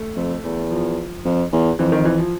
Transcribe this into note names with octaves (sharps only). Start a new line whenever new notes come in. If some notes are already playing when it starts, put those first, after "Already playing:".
Already playing: A3
F2
E2
F3
F2
E2
F2 E3
D#3
E3
F3